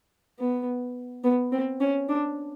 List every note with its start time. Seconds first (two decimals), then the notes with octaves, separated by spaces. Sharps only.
0.39 B3
1.24 B3
1.52 C4
1.81 C#4
2.09 D4